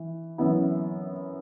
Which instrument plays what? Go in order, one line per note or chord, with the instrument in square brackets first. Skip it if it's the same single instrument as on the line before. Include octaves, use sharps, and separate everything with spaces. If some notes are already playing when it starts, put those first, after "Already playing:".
Already playing: [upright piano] E3
F#2 E3 B3 E4